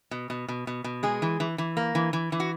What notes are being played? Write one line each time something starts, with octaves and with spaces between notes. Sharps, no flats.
B2
B2
B2
B2
B2
G#3 G#4
E3
E3
E3
A#3
E3
E3
E3
F#4